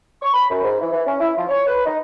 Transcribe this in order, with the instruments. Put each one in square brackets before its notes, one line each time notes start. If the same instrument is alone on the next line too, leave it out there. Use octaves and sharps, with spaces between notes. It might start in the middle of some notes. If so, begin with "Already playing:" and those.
[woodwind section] C#6
B5
F#2
G#2
E3
E3
C#4
E4
F3
C#5
B4
D#4